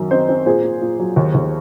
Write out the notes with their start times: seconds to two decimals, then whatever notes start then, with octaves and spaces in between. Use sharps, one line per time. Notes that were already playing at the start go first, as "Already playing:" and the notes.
Already playing: F#2 D#3 F#3
0.11 C4 C5 D#5
0.29 C4
0.46 A#2 G#4 C5
0.64 A#2
0.81 A#2
0.99 F#3
1.16 D#2
1.34 D#2